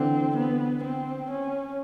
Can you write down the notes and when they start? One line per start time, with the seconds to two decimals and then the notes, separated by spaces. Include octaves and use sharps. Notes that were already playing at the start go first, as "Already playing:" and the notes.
Already playing: D3 E3 C4
0.36 B3
0.83 C4
1.30 C#4